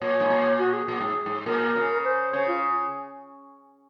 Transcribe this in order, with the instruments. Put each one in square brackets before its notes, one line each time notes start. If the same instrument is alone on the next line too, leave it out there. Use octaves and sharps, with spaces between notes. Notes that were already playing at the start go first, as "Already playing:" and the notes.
[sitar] A#2 [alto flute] C#5
[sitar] G#2
A#2
[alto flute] F#4
G#4
[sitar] A#2
G#2
G#2
[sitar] A#2 [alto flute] A#4
[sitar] C#3
[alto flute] C5
[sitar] C#3 [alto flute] C#5
[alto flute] F4